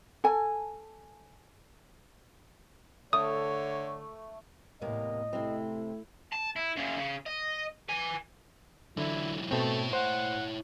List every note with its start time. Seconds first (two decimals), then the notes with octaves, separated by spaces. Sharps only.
0.24 A4 G#5
3.13 D3 A3 C#5 D#6
4.81 E2 A2 C3 A#3 D#5
5.33 C3 A3 C4 E4
6.33 A5
6.56 E4
6.76 F#2 C#3
6.97 C#3
7.26 D#5
7.89 B4 G#5
8.97 D3 E3 F#3 E4
9.51 B2 A3 C4 E4 C#5
9.93 C5 F#5